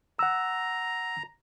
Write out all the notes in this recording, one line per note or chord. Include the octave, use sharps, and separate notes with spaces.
F#5 A#5 E6